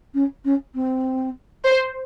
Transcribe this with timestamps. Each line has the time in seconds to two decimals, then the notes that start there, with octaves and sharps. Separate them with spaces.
0.13 C#4
0.44 C#4
0.74 C4
1.65 C5